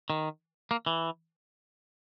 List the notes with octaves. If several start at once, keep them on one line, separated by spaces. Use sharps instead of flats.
D#3
A#3
E3